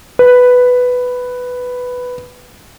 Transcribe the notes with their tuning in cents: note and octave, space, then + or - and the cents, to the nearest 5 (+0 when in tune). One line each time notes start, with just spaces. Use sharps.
B4 +5